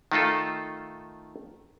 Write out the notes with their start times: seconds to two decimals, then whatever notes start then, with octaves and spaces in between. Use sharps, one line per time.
0.12 D#3 A3 D#4 F4 A4